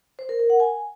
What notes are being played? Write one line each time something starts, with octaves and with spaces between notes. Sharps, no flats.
C5
A#4
A#4
F#5
G#5